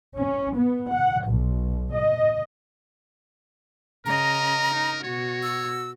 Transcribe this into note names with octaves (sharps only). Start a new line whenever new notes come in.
C#4
B3
F#5
B1
D#5
C#3 A#4 D#5 A#5
D#4
B2 F#4 C#5
E6